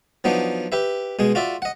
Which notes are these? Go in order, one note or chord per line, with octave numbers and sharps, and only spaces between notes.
F3 F#3 B3 D4 D#4
G4 B4 E5
B2 G#3 G#4
F4 F#4 D5 E5
D#5 F#5